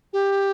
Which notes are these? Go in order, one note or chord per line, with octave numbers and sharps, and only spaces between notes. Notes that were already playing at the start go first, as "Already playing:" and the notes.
G4